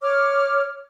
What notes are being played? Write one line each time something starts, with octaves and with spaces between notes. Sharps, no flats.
C#5 D6 F6